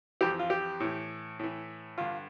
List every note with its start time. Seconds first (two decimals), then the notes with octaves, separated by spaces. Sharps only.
0.21 F2 E3 G4
0.39 F4
0.50 G4
0.80 A2 E3
1.39 A2 E3
1.98 G2 D3 F4